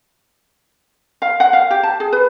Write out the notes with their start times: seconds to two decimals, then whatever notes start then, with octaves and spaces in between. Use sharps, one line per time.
1.22 F5
1.40 F#5
1.53 F5
1.71 G4
1.83 A5
2.00 G#4
2.13 B4